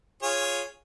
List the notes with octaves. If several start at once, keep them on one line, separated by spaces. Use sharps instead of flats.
F4 G#4 C#5